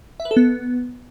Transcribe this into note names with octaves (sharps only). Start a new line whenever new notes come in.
E5
B4
A4
B3